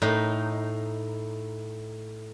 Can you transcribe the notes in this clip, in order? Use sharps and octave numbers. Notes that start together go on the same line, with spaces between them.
A2 D#4